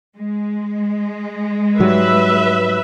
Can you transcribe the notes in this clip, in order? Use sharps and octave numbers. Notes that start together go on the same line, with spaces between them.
G#3
G#2 F#3 G3 B4 E5